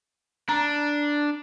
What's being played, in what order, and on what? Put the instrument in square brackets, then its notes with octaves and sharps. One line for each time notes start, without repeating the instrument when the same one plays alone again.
[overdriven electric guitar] D4 [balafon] A#5